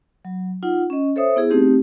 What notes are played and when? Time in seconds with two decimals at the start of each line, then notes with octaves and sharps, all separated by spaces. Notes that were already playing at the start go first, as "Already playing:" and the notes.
0.25 F#3
0.63 D#4 F4 F#5
0.90 C#4 D#5
1.16 A4 C5 C#5 E5 D#6
1.36 B3 E4 G#4
1.50 A3 C4 D#4 G4